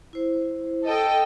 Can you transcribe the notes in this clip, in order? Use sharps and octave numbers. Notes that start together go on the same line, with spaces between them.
E4 C5
A4 D#5 G5